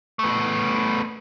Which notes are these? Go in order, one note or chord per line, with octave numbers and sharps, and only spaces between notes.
A3 B3